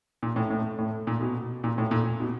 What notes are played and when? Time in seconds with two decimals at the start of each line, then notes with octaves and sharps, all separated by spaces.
0.23 A#2
0.36 A2
0.50 A2
0.78 A2
1.07 A#2
1.21 B2
1.64 A#2
1.78 A2
1.91 A#2
2.20 B2